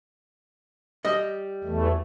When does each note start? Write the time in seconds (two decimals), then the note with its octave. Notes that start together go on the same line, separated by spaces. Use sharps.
1.05 G3 D#5
1.64 E2 E3 A3